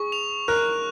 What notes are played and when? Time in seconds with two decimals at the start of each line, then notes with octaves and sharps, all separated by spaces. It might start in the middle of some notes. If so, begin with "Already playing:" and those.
Already playing: G#4 C#6
0.12 F7
0.48 A#4 F#6